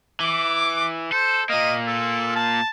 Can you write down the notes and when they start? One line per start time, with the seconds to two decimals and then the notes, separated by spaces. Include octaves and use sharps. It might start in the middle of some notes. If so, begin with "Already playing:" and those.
0.20 E3 D6
1.12 A4 C5
1.50 A#2 A#3 D#5
1.87 A4
2.36 A5